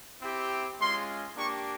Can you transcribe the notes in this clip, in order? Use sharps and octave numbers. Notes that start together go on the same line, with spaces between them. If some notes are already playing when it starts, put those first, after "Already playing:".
C4 E4 G4
G#3 C#4 F4 C6
A#3 D4 G4 C#6